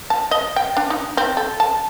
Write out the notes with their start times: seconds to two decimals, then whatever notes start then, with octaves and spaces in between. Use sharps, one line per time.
0.10 A5
0.31 D#5
0.56 G5
0.77 D4
0.90 D#4
1.17 C4
1.37 A4
1.60 A5